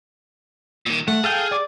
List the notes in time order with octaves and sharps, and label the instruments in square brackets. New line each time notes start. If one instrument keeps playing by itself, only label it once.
[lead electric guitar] A#2 D#3
[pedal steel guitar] A3 [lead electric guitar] F#5
[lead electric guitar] G#4 [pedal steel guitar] A4 F5 G5
[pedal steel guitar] D5 D6